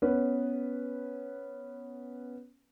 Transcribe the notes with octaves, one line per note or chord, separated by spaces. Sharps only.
B3 C#4 B4